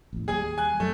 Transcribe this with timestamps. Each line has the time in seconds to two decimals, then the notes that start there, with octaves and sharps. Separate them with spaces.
0.13 A1 E2
0.28 D#2 G3 G#4 G#5
0.58 G#5 F#6
0.80 F#2 F#3 A3